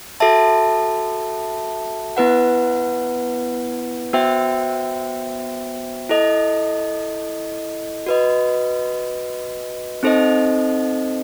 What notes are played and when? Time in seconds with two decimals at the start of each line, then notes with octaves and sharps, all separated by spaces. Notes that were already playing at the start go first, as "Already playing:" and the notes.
0.20 F#4 A4 E5 A5
2.17 B3 E4 B4 F#5
4.13 B3 F#4 C5 E5 G5
6.09 E4 A4 D#5
8.06 F#4 B4 D#5
10.03 C4 D#4 A4 C5 D#5